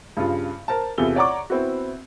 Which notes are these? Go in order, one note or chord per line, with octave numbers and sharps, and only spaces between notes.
G2 C#3 F4
A#4 C5 A5
E2 C3 E3 F4 A4 G7
C#5 D5 F#5 A#5 C#6 D6
B3 C4 E4 F#4